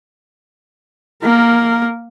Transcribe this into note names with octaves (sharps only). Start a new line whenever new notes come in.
A#3 A#4